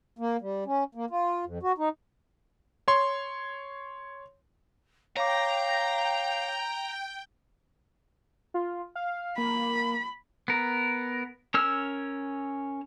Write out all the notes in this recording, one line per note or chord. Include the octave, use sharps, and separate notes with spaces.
A#3
G3
C#4
A#3
F4
F2
F#4
D#4
C#5 C6
C#5 F5 G5 A#5 D6
F4
F5
A#3 B5
B3 A#4
C#4 A#4 E6 F6